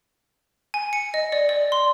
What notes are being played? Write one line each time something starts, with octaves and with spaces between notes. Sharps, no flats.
G#5
C#7
D#5
D5
D5
C6